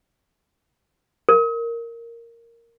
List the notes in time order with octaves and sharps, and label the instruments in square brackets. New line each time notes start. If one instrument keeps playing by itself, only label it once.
[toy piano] A#4